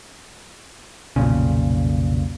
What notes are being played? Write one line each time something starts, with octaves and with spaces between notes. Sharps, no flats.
B1 F2 A#2 C#3